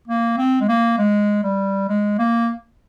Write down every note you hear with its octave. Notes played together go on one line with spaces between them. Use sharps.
A#3
C4
G#3
A#3
G#3
G3
G#3
A#3